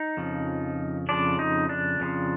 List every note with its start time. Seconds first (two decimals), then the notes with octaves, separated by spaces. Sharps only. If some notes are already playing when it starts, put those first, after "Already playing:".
Already playing: D#4
0.17 F2 C#3 F3
1.09 F2 C#3 F3 D4
1.39 D#4
1.69 D4
2.00 F2 C#3 F3